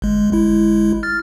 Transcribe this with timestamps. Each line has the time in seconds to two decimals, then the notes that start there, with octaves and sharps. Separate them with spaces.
0.02 G1 G#3
0.32 G1 G#3 E4
1.03 F6 A6